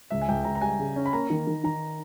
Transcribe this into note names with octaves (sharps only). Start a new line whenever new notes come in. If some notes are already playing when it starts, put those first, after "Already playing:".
C#2 E5
G#5
C#2 G5
C#2 A#5
A#5
G3 G#5
C#3
C#4
B5
A#3 A#5
D#3
D#3
D#3 A#5